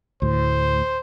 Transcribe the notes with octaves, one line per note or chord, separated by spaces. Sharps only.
D2 A2 C5